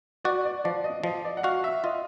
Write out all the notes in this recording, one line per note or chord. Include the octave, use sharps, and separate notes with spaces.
F#4 D5
D5
F3 D5
D#5
F3 D#5
D5
F#5
F#4 F5
E5
F4 D#5